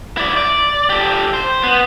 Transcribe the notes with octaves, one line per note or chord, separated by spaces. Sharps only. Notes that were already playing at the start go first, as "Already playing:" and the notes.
E4 D5
D5
G4 A4
C5
B3